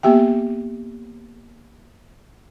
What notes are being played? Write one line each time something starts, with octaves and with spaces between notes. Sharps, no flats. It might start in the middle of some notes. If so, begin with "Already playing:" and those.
A#3 B3 G4 E5 G5